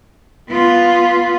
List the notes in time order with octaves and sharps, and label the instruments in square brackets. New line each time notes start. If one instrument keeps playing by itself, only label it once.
[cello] B3 F4